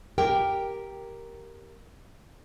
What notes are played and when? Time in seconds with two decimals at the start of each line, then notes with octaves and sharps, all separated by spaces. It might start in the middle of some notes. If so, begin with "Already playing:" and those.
0.18 G4 A#4 G5